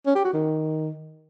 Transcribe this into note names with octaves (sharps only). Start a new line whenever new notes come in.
C#4
G4
F#4
D#3